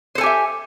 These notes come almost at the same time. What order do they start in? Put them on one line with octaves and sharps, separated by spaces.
C5 A4 G#5 G4 E5